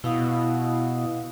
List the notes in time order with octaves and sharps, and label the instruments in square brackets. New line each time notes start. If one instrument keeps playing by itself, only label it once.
[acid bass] B2 [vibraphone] E4 F5 D#6